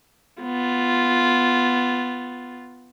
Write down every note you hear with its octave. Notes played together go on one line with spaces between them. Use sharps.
B3 F4